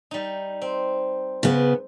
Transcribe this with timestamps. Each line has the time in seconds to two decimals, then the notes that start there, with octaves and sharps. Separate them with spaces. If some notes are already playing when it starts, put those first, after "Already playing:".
0.11 G3 D#4
0.62 C4
1.43 C#3 B3